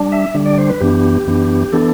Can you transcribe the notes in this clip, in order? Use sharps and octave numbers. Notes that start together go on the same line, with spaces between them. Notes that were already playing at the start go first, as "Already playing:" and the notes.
Already playing: G3 D4
E5
D3 G3 D4
D5
C5
B4
F#2 E3 B3 D4 G4
F#2 E3 B3 D4
E3 B3 D4 A4